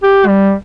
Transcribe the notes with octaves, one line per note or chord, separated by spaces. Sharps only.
G4
G3